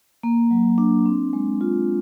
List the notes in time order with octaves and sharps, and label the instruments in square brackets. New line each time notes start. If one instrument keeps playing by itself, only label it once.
[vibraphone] A#3
F#3
D4
C4
G#3
F4